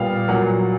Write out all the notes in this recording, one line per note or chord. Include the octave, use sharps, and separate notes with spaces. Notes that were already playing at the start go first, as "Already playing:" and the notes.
Already playing: A#2 G3 B3 F5
A#2 F#3 A#3 F#5